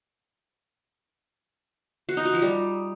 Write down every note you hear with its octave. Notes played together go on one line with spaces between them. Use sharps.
F#4
D#4
F#4
F3
G3